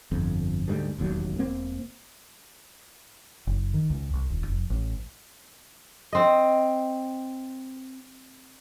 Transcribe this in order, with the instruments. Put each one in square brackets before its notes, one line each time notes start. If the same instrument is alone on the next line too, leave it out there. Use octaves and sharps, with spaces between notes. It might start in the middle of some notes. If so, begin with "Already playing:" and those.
[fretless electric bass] G1 F2
D2 G#2 G3
E1 A1 D#2 F#3
E1 A#3 C4
[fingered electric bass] F#1
D#3
C#2
C2
D#1
F1
A1
[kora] C4 D#5